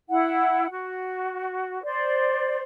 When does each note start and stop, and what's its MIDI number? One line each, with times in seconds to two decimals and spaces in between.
0.09 0.68 64
0.09 0.68 78
0.70 1.82 66
1.83 2.62 72
1.83 2.62 74